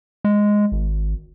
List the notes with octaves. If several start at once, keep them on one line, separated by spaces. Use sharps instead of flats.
G#3
G#1